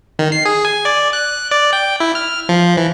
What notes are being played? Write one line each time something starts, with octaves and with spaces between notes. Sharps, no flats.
D#3
C7
G#4
G#5
D5
F#6
D5
G5
E4
F6
F3
E3